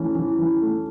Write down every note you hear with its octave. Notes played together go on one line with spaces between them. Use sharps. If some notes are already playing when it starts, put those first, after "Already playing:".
Already playing: E3 A3 C#4
E3
E3
A3